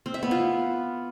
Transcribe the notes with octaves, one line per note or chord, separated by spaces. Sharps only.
C4
E5
B3
F4